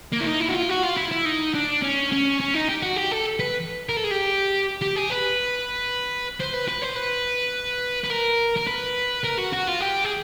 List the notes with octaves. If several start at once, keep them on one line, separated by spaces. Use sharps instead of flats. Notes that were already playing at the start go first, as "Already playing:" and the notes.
A#3
E4
D#4
E4
F#4
F4
F#4
F4
E4
E4
D#4
D4
C#4
C#4
C#4
D#4
G4
F#4
G4
A4
B4
A#4
A4
G#4
G4
G4
G#4
B4
C5
B4
B4
C5
B4
B4
A#4
A#4
B4
A#4
F#4
F#4
F4
G4
G#4